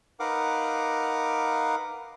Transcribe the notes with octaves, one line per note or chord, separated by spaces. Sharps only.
D#4 A#4 B4 F5 F#5 D6